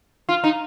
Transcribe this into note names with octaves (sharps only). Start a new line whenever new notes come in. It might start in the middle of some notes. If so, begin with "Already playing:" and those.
F4
D#4